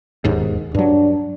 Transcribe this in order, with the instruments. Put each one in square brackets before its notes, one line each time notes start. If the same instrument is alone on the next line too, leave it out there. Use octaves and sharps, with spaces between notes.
[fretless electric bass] E1 D#2 G#2
[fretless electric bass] G2 F#3 [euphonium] D4